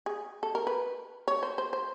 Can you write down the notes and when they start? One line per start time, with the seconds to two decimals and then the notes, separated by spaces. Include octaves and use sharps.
0.06 G#4
0.43 A4
0.55 A#4
0.67 B4
1.28 C#5
1.43 C5
1.58 C5
1.73 C5